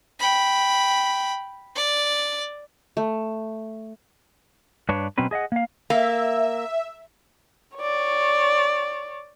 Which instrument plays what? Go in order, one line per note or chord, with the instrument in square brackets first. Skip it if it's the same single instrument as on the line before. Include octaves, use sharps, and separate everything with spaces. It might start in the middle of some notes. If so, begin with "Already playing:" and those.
[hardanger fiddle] G5 B5
D5
[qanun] A3
[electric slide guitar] G2 D4 B4 C#5
B2 F#3 C4 C#4 B4
G#4 D#5 E5 F#5
A#3 F5
[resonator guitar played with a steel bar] A#3 [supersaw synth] E5
[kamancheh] C#5 D5